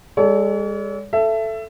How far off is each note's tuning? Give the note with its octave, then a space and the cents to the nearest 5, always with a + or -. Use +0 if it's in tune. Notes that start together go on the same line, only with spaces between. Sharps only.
G#3 -45 A4 -10 C#5 +40
A4 +0 E5 +20